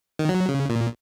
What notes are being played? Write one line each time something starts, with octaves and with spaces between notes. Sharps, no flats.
D#3
F#3
C#3
A#2